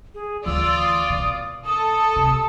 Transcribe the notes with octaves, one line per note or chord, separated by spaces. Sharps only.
G#4
D2 E3 F4 D5 E6
D#6
B2
A4 D#6
C3